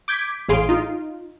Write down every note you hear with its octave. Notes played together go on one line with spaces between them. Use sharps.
D6 G6 G#6 B6 D7
A1 A2 G#4 F5 C6 D7
D#4 F4